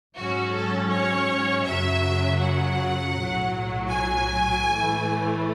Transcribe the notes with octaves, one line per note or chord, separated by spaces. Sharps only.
G#2 F#3 C#4 F#4
A4
C#5
F#2 C#3 F#3 E5
F#5
B1 A2 F#3
G#5
A2 E3 A3